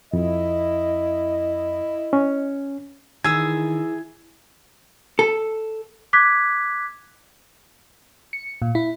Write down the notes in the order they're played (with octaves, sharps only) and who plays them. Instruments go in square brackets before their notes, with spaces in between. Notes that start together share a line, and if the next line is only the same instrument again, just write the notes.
[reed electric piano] F2 [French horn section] E4 D#5
[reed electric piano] C#4
[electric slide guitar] D#3 [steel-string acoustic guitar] E3 [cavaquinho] G#4 [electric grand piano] E6 G#6
[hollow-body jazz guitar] A4
[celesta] D6 F#6 G#6 B6
[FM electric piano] C#7
A#2
E4